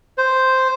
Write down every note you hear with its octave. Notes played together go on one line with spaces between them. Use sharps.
C5